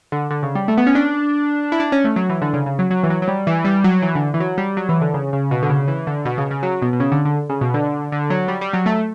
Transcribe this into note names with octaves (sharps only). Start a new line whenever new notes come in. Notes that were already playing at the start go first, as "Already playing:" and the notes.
D3
D3
C#3
G3
A3
B3
C#4
D4
E4
D4
C#4
A3
F#3
E3
D3
C#3
C#3
F#3
F#3
E3
F#3
F#3
G3
E3
G3
F#3
E3
D3
E3
F#3
G3
F#3
E3
D3
C#3
C#3
B2
D3
C#3
E3
D3
B2
C#3
C#3
F#3
B2
B2
C#3
D3
D3
C#3
B2
D3
D3
F#3
G3
G3
F#3
A3